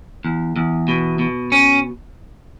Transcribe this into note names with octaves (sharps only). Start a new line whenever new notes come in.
E2
E2
B2
B2
C#4